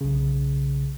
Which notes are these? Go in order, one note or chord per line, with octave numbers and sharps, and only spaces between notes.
B1 C#3